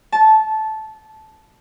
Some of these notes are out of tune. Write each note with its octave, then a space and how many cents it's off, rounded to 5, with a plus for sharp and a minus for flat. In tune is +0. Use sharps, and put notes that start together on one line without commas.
A5 -15